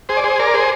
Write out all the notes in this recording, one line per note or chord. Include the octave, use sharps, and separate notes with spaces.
G#4 C5
D5
G#4 C5
A#4 D5
G#4 C5